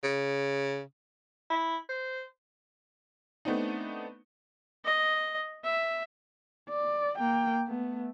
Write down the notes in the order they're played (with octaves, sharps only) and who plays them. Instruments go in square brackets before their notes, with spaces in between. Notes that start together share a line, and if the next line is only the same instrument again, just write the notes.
[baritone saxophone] C#3
[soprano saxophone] E4
C5
[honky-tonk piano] A3 B3 C4 D4 D#4
[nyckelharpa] D#5
E5
[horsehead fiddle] D5
A#3 G5
A3 B3